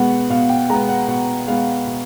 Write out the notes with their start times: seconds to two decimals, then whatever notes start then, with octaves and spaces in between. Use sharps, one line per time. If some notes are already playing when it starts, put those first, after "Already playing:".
Already playing: B2 G#3 B3 F#5
0.30 B2 F5
0.49 G5
0.69 G#3 A#5
0.74 B3
0.89 F#5
1.08 B2 F#5
1.47 G#3 B3 F5
1.87 B2